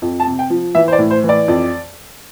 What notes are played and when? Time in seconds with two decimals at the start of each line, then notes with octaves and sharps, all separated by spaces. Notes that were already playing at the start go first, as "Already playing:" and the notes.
0.02 F2
0.20 A5
0.27 C3
0.39 G5
0.50 F3
0.75 E3 E5
0.88 C5
0.93 D5
0.99 A2
1.11 C5
1.24 E3
1.29 D5
1.48 F2